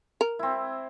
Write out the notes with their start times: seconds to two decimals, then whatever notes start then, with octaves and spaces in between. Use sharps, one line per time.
0.21 A#4
0.39 C4 E4